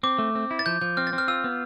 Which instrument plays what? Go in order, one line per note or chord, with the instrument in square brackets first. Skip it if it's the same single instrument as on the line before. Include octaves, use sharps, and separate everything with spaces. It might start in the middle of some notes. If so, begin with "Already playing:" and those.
[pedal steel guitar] C4 [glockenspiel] D6
[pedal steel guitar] A3
C4
E4
[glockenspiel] A6
[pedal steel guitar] F3 [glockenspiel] G6
[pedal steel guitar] F3 [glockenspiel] G6
[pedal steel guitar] C4 [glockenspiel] F6
[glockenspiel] A6
[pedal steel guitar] C4
[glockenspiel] F6
[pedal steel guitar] F4 [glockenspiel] E6
[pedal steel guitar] B3